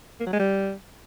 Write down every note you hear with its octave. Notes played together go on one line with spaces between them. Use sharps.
A#3
F#3
G#3
G3